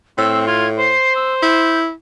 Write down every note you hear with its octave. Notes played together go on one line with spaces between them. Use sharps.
A2 C4 E6
F4 G#6
C5 C7
E6
E4 G6